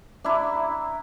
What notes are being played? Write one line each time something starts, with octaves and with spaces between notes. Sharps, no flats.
D4 E4 E5 A#5